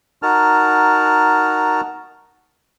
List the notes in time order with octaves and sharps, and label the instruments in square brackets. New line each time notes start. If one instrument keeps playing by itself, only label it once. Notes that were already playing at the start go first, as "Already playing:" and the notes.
[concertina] D#4 F#4 A#4 A5 F6